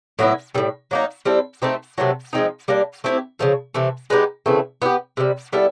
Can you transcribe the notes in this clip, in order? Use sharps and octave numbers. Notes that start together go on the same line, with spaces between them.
A2 F#3 B3 E4
A2 E3 G3
F#3 A#3 D#4
G3 C4 E4 A4
A3 C4 D#4 G4
C3 D#3 F#3 A3
F3 G#3 C4 D#4
G3 A#3 D4
A3 C4 E4 G4
C#3 F3 A3
C3 E3 A3
G#3 B3 D#4 G4
C#3 E3 A3 C4
B3 E4 G4
C3 D#3 G3
G3 B3 E4 A4